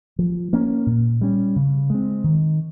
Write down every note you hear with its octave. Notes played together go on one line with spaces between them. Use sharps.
F3
A#3 C#4
A#2
G3 C#4
C#3
G#3 C4
D#3